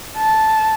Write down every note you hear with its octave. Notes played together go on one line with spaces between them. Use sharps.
A5